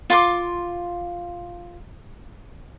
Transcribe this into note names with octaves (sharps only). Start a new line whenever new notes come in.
F4 C6 D6